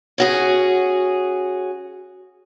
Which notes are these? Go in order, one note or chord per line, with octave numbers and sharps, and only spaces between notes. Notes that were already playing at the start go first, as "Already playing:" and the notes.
C#4 F#4 G#4